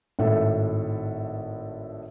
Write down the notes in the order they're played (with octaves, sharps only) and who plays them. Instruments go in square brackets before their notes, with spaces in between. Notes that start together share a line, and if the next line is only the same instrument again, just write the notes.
[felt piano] G#1 A2 A4 E5